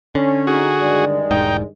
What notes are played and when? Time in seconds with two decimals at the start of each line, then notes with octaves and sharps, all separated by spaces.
0.15 D3 C#4
0.47 D#4 F#4 G#4
0.80 G2 D#3 G#3 D5
1.31 E1 G#2 D#4 G5